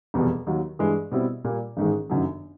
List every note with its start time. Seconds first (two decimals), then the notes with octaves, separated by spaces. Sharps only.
0.14 F1 E2 B2 G3
0.47 D#2 D#3 F#3
0.79 G2 E3 G#3
1.11 B2 G3 C4 E4
1.44 A#2 G3 A#3
1.77 A1 G#2 D#3 G#3
2.10 G1 F#2 D#3 F#3